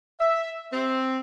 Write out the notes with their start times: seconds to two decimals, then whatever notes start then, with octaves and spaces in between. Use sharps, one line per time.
0.20 E5
0.73 C4